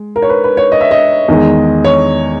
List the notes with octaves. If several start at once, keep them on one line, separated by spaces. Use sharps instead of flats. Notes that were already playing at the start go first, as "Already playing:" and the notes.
Already playing: G#3
A#4
C#5
B4
B4
C#5
D#5
E5
D#5
E2 D#3 G#3
C#5